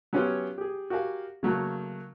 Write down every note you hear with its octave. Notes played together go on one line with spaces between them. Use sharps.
F#3 B3 C#4 F4 G4 C#5
G4 G#4
F#4 G4 A#4 F5 G#5
C#3 F#3 A3 A#3